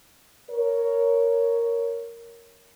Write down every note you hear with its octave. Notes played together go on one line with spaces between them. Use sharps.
A#4 C#5